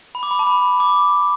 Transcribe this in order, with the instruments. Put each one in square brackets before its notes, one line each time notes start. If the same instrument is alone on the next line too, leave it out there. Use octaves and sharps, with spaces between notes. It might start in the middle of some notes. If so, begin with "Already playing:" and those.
[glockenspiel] B5
D6
B5
A5
B5
D6